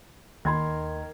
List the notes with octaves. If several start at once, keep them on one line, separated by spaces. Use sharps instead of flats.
D#2 D#3 A#4 B5 C6 G#6